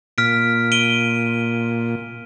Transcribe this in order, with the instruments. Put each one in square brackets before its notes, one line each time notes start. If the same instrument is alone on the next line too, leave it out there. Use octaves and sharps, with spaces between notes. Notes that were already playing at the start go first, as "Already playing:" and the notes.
[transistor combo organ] A#2 [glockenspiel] F6 B6 D7
[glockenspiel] D7 D#7 G7